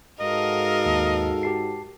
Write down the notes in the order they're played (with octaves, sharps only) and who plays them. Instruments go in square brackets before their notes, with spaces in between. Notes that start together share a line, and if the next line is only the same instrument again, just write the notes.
[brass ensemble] G#2 F#4 A4 [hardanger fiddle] A#4 F5 [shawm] D#5
[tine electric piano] D#2
G4 A5 C7